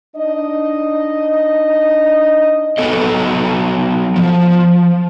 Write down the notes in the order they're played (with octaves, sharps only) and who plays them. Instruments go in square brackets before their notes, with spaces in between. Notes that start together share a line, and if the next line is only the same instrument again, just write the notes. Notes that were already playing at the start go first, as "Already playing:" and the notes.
[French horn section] D4 D#4 D#5
[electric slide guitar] F#3 B3 A4 D#5
F3